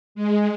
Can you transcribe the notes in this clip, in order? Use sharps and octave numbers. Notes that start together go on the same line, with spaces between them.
G#3